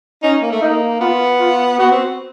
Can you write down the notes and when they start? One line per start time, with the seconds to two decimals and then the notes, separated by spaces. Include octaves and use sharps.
0.23 C#4 D#4
0.42 A#3
0.51 A3
0.61 A#3 D#4
1.00 B3 F4
1.40 F4
1.79 B3 F#4
1.92 C4